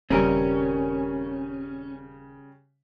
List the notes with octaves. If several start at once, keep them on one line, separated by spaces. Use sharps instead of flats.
D#1 C#3 G3 C4 C#4 G#4 A#4